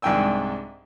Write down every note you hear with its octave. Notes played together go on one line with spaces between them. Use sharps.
C2 G#2 D4 G5 G#5 E6